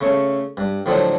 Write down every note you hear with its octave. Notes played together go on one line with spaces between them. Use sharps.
C#3 A3 C#5
G2
A2 D3 F3 F#3 A3